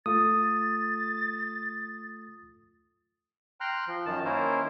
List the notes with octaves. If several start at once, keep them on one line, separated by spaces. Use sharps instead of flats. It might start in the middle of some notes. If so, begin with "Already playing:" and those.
A3 F4 A4 D#6 A6
G5 A#5 C6 F6 F#6
F3
F#2 D#3 A5
D#3 A#3 C#4 E4 A#4 C5